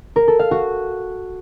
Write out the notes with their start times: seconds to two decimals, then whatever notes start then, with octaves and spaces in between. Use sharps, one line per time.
0.16 A#4
0.28 A4
0.39 F5
0.51 F#4